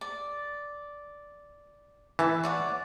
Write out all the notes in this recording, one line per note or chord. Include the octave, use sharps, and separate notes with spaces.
D5
E3 E5 A5
C#5 D5 F#5